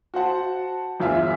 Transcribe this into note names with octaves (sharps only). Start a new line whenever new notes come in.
F#4 C5 F#5 A5
G1 E2 F4 E5